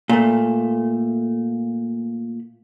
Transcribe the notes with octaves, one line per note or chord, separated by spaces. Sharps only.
A#2 A3